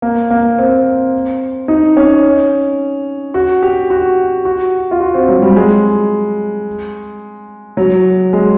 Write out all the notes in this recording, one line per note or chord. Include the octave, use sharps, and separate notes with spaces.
A#3
A#3
C4
D#4
C#4
F#4
G4
F#4
F#4
F4
F#4
C4
F#3
G3
G#3
F#3
G#3